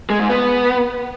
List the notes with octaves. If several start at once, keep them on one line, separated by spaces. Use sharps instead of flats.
G#3
G#2
B3